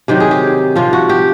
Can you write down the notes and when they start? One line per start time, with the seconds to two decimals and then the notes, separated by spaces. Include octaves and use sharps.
0.08 C3 D#3 F#3 G4
0.20 G#4
0.31 G4
0.76 C3 F3 F4
0.93 F#4
1.09 G4